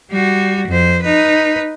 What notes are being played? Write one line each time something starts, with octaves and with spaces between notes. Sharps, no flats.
G3 F#4
F2 C5
D#4 B4